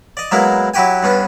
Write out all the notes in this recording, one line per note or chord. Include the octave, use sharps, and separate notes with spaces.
D5 D#5
F#3 G#3 A#3 B3 E4 A#4
F#3 E4 F#4 G4 G5 G#5
G2 B3 C#4 D4